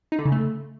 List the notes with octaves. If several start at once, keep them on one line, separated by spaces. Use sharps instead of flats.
D#4
D3
C#3
A3